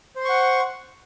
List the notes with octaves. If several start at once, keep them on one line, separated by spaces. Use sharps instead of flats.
C5 F#5 C6 C#6